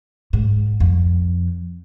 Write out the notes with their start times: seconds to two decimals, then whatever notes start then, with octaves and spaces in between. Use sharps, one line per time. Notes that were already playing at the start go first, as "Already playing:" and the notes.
0.33 G#2
0.80 F2